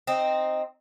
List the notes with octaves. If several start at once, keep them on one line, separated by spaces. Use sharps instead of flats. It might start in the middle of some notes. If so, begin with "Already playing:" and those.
C4 D#4